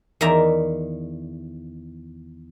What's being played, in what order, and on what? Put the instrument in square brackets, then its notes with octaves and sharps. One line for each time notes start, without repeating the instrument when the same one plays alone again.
[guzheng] E2 D#3 D5 E5 A#5